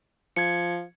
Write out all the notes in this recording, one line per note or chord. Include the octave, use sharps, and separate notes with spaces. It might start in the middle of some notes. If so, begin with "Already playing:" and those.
F3 G#6 C#7